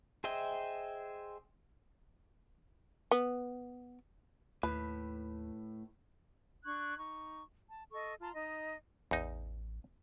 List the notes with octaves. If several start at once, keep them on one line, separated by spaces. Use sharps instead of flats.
G#4 C5 D#5 E5 G5
B3
D#2 A2 B4
D4 C#6 F#6 G#6
D#4 C#6
A5
A4 D#5 C#6
F4 A5 A#5 C6
D#4 D#5
A1 E2 D#4